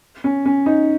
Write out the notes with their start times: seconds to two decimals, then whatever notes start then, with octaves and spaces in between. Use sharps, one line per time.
0.24 C#4
0.46 C#4
0.66 D#4